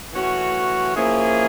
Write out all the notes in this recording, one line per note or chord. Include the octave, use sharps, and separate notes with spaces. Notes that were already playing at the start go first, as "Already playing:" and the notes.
E3 A3 C#4 F#4
F3 A#3 C#4 E4 G#4